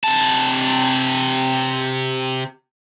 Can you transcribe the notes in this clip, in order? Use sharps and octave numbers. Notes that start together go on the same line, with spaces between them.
C3 A5